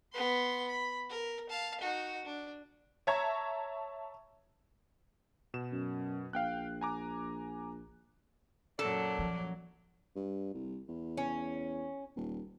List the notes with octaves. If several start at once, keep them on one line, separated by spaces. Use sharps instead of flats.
B3 C6
B5
A#4
F5 A5
D#4 F#4
D4
C#5 E5 A5 A#5 C#6 G#6
B2 E7
F#2
A#1 F5 G5 F#6
G#5 A#5 D6
F#2 A#2 F#3 A4 A#4 D5
F3
G2
C2
E2
C#4
D#1